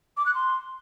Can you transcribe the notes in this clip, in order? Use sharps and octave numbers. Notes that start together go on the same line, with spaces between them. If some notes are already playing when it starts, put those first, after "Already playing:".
D6
F#6
C6